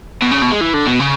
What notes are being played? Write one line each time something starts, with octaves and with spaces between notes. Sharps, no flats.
B2
C#3
B2
G#3
E3
D3
B2
C#3